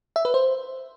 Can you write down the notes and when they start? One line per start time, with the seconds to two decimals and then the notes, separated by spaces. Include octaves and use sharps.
0.16 E5
0.25 B4
0.34 C5